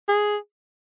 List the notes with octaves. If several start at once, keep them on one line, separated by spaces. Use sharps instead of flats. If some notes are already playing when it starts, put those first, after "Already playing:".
G#4